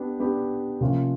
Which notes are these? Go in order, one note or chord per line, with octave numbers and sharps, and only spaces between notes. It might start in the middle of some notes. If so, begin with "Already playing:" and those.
Already playing: B3 D4 G4
B3 D4 G4
C3 F3 A#3 C#4 F4